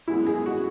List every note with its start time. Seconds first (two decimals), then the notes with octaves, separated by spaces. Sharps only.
0.08 F#2 E3 G#3 B3 E4
0.27 G#4
0.46 F#4